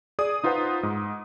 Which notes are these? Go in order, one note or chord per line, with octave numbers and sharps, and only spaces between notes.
G#4 D5 D#6
D#4 F4 B4 C5 F#5
G#2